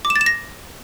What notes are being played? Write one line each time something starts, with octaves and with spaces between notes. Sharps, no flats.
D6
E7
A6
E7
A#6